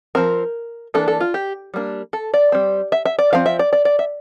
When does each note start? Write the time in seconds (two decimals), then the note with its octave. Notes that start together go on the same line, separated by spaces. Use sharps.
0.15 F3 C4 A#4
0.94 E3 G3 A#3 D4 A4
1.08 A4
1.20 F4
1.34 G4
1.74 G3 A#3 D4
2.13 A4
2.34 D5
2.52 G3 C4
2.92 E5
3.05 E5
3.19 D5
3.33 F3 C4 F5
3.46 E5
3.59 D5
3.73 D5
3.85 D5
3.99 E5